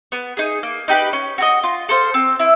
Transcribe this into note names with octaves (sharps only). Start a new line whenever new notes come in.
B3
D#4 G#4
A#3
D#4 G4 B4
C#4
F#4 A#4 D#5
F4
A4 C5 F5
C4
E4